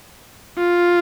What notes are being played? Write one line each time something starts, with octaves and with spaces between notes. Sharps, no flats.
F4